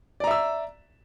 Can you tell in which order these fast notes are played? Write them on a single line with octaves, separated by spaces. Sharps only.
D5 A#5 E5 E6